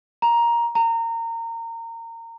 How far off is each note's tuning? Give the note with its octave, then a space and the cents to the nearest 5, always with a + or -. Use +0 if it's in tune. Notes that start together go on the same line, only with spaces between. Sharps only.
A#5 +10
A#5 -25